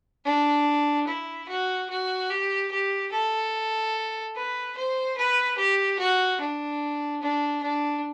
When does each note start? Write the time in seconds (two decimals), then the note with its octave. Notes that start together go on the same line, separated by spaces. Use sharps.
0.25 D4
1.07 E4
1.48 F#4
1.89 F#4
2.30 G4
2.72 G4
3.12 A4
4.35 B4
4.77 C5
5.17 B4
5.57 G4
5.99 F#4
6.40 D4
7.22 D4
7.63 D4